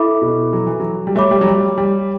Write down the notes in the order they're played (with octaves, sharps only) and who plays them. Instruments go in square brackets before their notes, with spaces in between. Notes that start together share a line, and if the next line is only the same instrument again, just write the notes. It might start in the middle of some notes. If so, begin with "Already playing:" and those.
Already playing: [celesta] E4 A4 E5 B5 D6
[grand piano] B2
F#3
E3
F#3
G3
[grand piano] A3 [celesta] G4 C#5 E5 B5 D6
[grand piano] G3
F#3
G3
G3